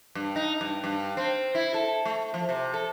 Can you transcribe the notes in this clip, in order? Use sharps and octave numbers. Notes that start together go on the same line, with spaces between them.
G2
D#4
G2
G2
C4
E4
A4
A3
F3
C3
A4